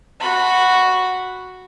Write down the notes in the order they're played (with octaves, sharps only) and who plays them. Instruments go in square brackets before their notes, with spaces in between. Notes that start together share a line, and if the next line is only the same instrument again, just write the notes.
[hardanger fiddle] F#4 B5